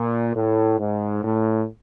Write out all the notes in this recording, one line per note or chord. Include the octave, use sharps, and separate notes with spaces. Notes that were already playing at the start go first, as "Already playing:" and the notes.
Already playing: A#2
A2
G#2
A2